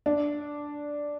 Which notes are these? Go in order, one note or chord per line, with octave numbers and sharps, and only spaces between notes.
D4